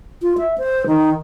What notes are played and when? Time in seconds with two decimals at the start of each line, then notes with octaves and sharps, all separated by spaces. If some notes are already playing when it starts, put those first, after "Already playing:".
0.22 F4
0.38 E5
0.58 C5
0.87 D#3